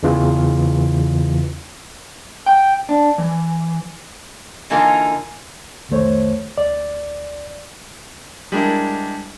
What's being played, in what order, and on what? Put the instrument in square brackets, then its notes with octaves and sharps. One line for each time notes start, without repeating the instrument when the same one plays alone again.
[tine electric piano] E2 C#3 E3 F4
[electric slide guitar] G5
D4
E3
[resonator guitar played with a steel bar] D3 E3 A#3 D#4 F4 A#4
[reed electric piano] C2 F2 D#3 A3 C5 C#5
D2 D5
[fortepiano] G3 G#3 D4 E4 A#4